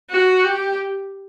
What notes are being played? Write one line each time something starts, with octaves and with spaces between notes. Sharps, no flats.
F#4
G4